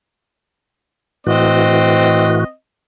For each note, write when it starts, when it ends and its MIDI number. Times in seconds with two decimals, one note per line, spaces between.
1.27 2.44 45
1.27 2.44 52
1.27 2.52 60
1.27 2.44 66
1.27 2.52 75